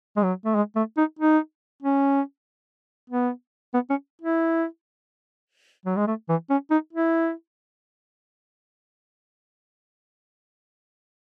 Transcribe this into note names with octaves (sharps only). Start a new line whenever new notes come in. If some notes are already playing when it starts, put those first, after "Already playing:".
G#3
F#3
A3
G#3
A3
D#4
D#4
C#4
B3
B3
C#4
E4
F#3
G#3
A3
E3
C#4
D#4
E4